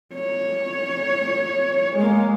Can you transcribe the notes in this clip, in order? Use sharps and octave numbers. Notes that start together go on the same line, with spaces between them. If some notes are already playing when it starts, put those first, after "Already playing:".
C#5
G#3 A#3